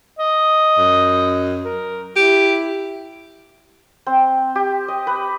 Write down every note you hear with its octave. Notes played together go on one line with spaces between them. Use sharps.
D#5
F#2
A#4
E4 G4
C4
G4
D#5
B4